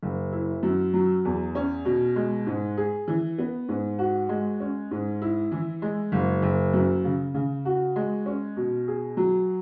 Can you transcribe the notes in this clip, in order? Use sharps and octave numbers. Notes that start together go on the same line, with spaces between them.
F#1
E4
F#2
F#3
E2
C#4
B2
G#3
G#2
G#4
E3
B3
G#2
F#4
G#3
C#4
G#2
E4
E3
G#3
F#1
F#1
F#2
C#3
C#3
F#4
G#3
C#4
B2
G#4
F#3